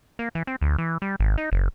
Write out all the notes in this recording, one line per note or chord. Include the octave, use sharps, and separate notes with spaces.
A#3
E3
C4
D2
E3
G3
G#1
D#4
F#1